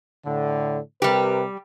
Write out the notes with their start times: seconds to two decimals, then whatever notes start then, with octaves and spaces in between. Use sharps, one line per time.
0.24 A2 D3
1.02 C3 G3 G4 A#4 B4